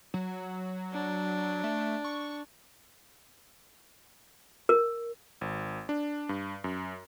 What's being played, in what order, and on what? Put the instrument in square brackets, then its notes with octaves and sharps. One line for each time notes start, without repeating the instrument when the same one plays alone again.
[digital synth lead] F#3
[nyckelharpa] D4
[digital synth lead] A3
C#6
[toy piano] A#4
[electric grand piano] G#1
D4
G2
F#2